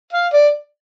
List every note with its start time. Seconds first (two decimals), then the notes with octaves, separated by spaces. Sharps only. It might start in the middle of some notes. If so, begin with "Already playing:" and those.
0.13 F5
0.34 D5